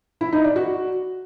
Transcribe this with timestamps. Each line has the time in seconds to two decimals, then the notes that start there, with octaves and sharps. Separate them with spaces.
0.21 E4
0.32 D#4
0.44 D5
0.56 F#4